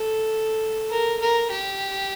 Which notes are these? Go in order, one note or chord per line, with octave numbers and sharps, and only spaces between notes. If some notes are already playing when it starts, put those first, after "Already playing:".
Already playing: A4
A#4
A#4
G4